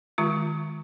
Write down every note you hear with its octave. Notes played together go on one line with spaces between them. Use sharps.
D#3 G#3 F4